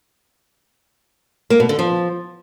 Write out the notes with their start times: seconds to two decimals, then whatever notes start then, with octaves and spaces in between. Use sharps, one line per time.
1.50 A#3
1.60 B2
1.69 D3
1.79 F3